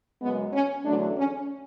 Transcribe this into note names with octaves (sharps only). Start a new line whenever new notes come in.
F#2 C#3 G#3 B3
C#4
E2 D3 F#3 A3 D4
C#4